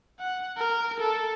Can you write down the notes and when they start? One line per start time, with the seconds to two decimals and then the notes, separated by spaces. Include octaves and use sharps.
0.20 F#5
0.58 A#4
1.00 A4